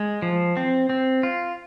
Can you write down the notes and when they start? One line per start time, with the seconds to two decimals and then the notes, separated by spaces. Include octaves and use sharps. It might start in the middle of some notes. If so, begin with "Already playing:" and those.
Already playing: G#3
0.22 F3
0.57 C4
0.90 C4
1.23 F4